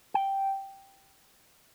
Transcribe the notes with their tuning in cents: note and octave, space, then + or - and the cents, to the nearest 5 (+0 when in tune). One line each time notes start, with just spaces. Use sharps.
G5 -5